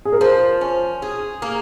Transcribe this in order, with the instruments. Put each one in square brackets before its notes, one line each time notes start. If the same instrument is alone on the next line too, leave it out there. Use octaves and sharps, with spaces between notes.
[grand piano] G#4
A#4
[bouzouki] F3 [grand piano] C5
[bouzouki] C#4
G#4
A#3